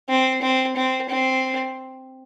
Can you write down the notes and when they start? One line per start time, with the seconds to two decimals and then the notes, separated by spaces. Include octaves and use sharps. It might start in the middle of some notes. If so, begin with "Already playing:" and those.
0.09 C4
0.42 C4
0.76 C4
1.09 C4